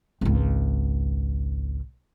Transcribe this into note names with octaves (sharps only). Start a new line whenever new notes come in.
G#1 C#2